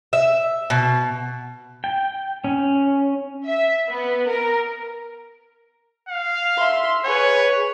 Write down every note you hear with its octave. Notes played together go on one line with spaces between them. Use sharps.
E5
B2
G5
C#4
E5
B3
A#4
F5
E5 C6
G#4 B4 C#5